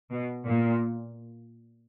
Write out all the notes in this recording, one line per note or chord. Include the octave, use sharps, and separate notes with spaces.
B2
A#2